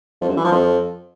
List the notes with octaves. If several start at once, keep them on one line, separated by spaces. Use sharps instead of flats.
F2
F#2
E3
F3
F2